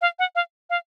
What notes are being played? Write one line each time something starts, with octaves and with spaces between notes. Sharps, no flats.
F5
F#5
F5
F5